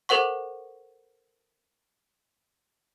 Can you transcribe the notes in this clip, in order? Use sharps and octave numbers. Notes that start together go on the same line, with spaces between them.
A4 A#4 C5 F#5 C#6